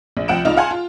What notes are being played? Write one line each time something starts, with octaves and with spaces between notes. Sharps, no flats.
A#1
C2 F3 F#5 G5 D7 E7
C#2 D#4 F4 D5 F6 F7
F5 F#5 G#5 A5 C6
F4